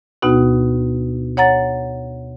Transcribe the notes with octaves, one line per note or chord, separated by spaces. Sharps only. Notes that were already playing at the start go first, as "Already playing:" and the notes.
D2 B2 B3 D#4 F#4
C#5 F#5 A#5 A6